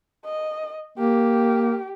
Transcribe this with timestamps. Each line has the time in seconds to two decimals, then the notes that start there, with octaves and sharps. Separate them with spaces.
0.25 D#5
0.98 A#3 G4